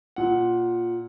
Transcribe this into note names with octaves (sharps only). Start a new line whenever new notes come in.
A#2 F#5